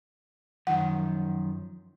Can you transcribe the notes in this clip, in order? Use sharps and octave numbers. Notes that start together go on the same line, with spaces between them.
F#2 D#3 F3 F#5